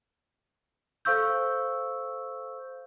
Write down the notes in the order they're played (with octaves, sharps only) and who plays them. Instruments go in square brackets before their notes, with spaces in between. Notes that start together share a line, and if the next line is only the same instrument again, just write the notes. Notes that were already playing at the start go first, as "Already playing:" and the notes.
[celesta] A4 C5 F5 C#6 E6 G6